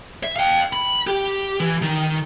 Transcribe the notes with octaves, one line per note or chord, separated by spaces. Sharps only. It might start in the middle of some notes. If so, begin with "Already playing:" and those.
E5
F5 G5
B5
G4
E3
D#3